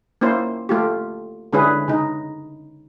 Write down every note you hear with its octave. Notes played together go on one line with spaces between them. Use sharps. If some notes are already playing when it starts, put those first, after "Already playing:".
A#3 C#4 E4 C5
A3 F4 G4
D3 G#3 C#4 E4 G#4 B4
C#3 D#4